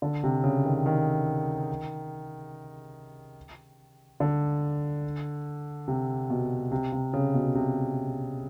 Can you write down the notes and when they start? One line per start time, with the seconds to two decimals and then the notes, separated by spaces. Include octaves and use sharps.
0.02 D3
0.23 C3
0.44 C#3
0.64 D#3
0.86 D#3
4.20 D3
5.88 C3
6.30 B2
6.71 C3
6.92 C3
7.13 C#3
7.34 B2
7.55 C3